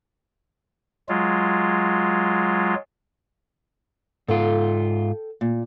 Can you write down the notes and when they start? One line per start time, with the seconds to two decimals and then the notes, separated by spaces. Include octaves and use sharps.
1.09 F#3 G#3 F4
4.28 G#2 F4 A4 G5
5.41 A#2